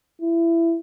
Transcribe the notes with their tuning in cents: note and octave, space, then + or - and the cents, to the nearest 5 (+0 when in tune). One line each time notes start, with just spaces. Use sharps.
E4 +20